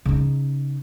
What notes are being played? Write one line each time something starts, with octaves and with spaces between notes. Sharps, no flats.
C#3 D#4